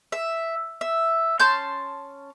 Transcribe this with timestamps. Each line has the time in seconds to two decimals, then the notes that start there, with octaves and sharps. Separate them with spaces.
0.12 E5
0.81 E5
1.39 C#4 A5 C6 G6